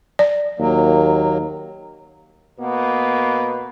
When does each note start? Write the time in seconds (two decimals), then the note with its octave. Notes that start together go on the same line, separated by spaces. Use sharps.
0.19 D5
0.59 D#2 F#3 A#3
2.59 B2 A#3 B3